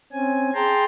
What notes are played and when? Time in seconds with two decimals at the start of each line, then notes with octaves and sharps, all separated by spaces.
0.12 C4 C#4 G#5
0.54 G#4 G5 A5 A#5 C6